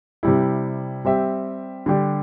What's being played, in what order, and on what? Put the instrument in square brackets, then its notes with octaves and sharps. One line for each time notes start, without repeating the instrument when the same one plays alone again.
[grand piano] C3 G3 E4
G3 C4 G4 E5
D3 G3 D4 G4